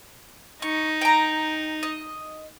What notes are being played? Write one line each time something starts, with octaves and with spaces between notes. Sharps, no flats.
D#4 C#6
G5 A#5
D#5